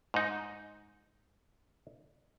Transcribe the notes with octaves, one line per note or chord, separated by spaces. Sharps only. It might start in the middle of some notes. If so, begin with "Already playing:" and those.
G#2 D#4